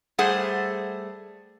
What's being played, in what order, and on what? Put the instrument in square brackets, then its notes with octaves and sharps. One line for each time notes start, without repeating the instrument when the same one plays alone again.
[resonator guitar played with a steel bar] G3 A3 G#4 C5 F#5